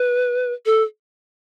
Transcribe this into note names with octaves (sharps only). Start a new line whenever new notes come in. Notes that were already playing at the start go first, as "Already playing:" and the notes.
Already playing: B4
A4